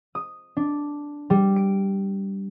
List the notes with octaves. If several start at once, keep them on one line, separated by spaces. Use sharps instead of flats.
D#6
D4
G3
D7